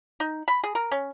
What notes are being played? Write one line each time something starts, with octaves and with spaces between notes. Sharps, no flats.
D#4
B5
G#4
A#4
C#4